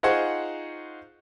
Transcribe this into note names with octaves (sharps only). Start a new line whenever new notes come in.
D#4 F4 G#4 C5 F#5 C#6